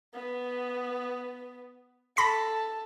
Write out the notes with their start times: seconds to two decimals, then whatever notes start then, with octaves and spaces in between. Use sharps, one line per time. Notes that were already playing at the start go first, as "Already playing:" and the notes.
0.14 B3
2.17 A4 B5 A#6 B6